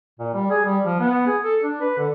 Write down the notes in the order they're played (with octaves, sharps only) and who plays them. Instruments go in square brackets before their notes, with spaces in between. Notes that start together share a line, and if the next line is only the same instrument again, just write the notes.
[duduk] A#2
G3
G#4
G3
F3
B3
G#4
A4
D4
B4
D3